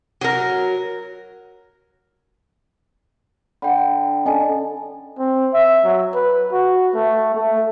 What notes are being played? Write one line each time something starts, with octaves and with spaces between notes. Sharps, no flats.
F#3 A#4
D3 G5 B5
C#4 A4 D5 D#5 G#5 A5
C4
E5
F#3
B4
F#4
A3
A3